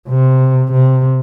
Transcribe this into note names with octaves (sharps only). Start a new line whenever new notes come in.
C3
C3